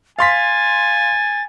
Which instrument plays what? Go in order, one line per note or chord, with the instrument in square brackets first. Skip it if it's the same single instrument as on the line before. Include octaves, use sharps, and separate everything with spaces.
[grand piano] F5 C6 B6 [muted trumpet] G#5 [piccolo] A6